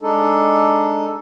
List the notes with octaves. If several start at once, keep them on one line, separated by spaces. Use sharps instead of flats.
G#3 D4 D#4 A4